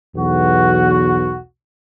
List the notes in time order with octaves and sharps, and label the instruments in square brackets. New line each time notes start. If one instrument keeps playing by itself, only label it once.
[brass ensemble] B1 E2 F#4